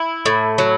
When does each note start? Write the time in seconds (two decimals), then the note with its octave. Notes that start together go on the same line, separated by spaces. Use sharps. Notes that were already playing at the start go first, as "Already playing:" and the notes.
Already playing: E4
0.26 A2
0.58 F#3